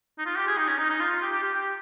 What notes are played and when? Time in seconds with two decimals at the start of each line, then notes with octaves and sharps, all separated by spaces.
0.18 D#4
0.26 F4
0.36 G4
0.47 G#4
0.57 D#4
0.68 C#4
0.78 D#4
0.90 D#4
1.00 F4
1.10 F4
1.22 G4
1.32 G4
1.43 G4
1.53 G4